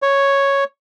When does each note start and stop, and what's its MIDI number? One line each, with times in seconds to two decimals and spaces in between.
0.02 0.64 73